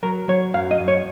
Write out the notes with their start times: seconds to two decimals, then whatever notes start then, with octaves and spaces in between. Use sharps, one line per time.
0.03 F#3 A#4
0.28 F#3 C#5
0.54 F#2 F5
0.71 D#5
0.80 F#2
0.88 C#5